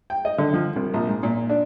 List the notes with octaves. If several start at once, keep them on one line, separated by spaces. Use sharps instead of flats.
G5
D#5
D3
F3
C2
A#1
G#2
A#2
D4